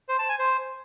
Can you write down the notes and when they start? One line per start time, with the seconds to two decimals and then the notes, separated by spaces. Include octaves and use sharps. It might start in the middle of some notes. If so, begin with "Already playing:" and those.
0.09 C5
0.19 A5
0.29 G#5
0.39 C5